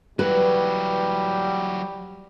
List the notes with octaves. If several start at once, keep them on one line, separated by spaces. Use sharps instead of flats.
E3 F#3 G3 B4